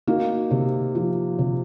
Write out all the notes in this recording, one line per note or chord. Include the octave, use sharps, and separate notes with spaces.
A#3 D#4 F#4
C3
F3
C3